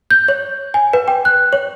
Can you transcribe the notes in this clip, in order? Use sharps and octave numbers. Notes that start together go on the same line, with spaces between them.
G6
C#5
G#5
B4
G5
F#6
C#5